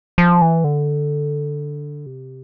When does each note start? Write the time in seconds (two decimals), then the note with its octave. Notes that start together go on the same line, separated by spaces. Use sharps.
0.18 F3
0.42 E3
0.64 D3
2.06 C3